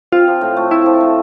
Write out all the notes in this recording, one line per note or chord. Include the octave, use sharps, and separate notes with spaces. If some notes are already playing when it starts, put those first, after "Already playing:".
C4 F4
F3
A2
A3
C4 E4
F3
A2